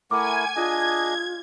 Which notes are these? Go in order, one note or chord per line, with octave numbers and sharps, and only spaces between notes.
A3 E4 A#4 F#5 G#5 D6 G#6
D4 F4 G#4 D#5 G#6